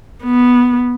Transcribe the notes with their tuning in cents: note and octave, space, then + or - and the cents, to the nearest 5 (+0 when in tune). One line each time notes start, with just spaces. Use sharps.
B3 -5